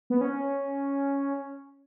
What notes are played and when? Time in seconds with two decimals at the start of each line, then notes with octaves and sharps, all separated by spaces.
0.10 B3
0.21 C#4